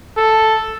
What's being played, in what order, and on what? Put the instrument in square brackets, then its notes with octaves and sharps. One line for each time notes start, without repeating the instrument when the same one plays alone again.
[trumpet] A4